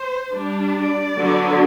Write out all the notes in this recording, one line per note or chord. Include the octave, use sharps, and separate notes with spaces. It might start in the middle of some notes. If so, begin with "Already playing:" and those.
Already playing: C5
G3 D4
D5
D3 F#3 B3